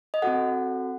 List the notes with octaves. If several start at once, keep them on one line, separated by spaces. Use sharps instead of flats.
D#5
C4 F#4 A4 F#5